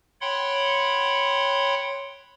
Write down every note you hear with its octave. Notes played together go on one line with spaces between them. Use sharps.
C#5 F#5 G5 B5 C6